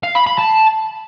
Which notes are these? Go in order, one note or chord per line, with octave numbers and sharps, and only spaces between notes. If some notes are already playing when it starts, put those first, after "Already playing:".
F5
B5
B5
A5